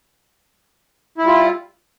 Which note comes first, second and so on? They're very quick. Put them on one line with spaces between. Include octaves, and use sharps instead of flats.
E4 G3 F4